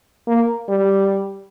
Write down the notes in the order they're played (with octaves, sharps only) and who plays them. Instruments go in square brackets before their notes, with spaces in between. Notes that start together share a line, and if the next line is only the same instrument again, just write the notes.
[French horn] A#3
G3